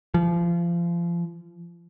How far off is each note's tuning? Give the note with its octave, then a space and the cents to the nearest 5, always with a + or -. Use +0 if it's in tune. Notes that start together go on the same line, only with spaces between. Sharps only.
F3 -30